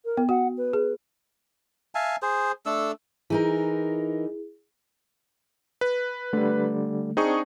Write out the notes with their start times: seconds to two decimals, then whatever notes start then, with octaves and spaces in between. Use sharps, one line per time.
0.04 A#4
0.17 B3
0.29 F#4 F#5
0.57 B4
0.73 G#4
1.95 E5 F5 G#5 A5
2.22 G#4 C5
2.66 A3 D4 A4 E6
3.30 E3 D#4 E4 G#4 A#4
5.81 B4
6.33 D3 G3 A3
7.17 C4 D4 D#4 G#4 C#6